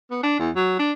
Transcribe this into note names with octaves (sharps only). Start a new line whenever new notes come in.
B3
D4
E2
F#3
D4